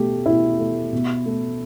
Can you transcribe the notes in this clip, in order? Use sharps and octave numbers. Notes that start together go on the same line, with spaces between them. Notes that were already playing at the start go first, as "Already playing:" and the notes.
Already playing: B2 A3 G4
B2 E4
A3
B2
A3